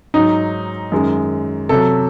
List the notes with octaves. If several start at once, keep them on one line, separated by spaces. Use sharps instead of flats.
G#2 F#3 D#4
F#2 D#3 G#3
C3 F#3 A4